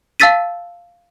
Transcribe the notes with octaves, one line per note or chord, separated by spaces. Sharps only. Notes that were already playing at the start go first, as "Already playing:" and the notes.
F5 A5 E6 A6 B6 D#7